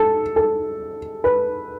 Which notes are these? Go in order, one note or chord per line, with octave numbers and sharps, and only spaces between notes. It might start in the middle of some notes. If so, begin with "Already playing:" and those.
Already playing: A4
A4
B4